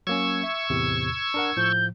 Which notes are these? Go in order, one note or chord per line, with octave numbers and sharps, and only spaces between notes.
F#3 A#3 C#4 C#6 E6 G#6
E5
E2 A2 C3
D4 A#4 F#5
A2 F3 G6